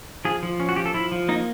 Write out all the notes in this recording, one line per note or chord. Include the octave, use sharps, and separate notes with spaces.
F3 G#4
F3
C#4
F#4
F3 G4
A4
F3 E4
F3
A#3 D#4